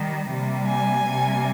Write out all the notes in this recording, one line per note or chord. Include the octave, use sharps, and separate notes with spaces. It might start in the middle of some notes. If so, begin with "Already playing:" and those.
Already playing: D#3 G3
C3 G3 A#3
G#5
C3 G3 A#3